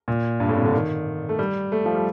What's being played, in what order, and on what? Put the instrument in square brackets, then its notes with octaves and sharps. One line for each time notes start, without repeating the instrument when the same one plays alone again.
[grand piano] A#2
G2
A2
C3
D3
D#3
A3
G3
A3
F3
G3